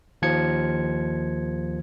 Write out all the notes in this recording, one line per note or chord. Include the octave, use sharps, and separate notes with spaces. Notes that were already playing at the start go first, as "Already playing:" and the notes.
D#2 F3 G#6 C#7